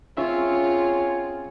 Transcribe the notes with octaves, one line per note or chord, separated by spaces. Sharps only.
C4 C#4 F4 G#4 C#5 E5